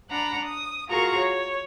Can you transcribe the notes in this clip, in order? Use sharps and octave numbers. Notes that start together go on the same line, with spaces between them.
D4 F#5 A#5 B5
D#6
F4 F#4 G#4 A#4 A#5 C#6
C#5